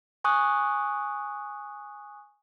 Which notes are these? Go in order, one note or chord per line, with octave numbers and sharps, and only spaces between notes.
G#5 C#6 D#6 F#6